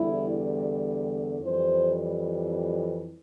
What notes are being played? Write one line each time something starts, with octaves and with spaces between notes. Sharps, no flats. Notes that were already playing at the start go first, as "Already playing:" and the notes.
Already playing: E2 D3 G3 E4
F2 E3 G3 C5